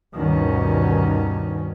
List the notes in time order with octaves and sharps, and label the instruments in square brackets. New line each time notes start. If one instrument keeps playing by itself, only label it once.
[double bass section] D2 G2 B2 D#3 C#4